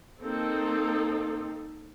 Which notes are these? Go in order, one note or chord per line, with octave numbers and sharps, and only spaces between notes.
A#3 C4 D#4 A4